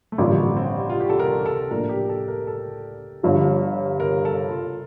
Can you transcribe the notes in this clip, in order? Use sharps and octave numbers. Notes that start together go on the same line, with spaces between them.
A3
A1 G2 D3 F3 A#3
C4
F4
G4
A4
A#4
A4
A2 F3 A#3 D4 A#4
G4
A4
A#4
A4
G1 G2 F3
A#4
A4
F4